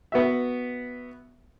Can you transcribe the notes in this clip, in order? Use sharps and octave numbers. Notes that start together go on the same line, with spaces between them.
B3 F#4 E5